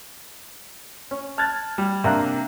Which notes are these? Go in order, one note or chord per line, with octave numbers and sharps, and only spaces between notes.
C#4
A5 F6 F#6 G#6 A6
G3
C3 A#3 D4 F5 A#5 F#6